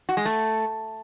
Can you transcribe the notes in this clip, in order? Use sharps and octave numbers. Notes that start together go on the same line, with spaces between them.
F#4
G#3
A3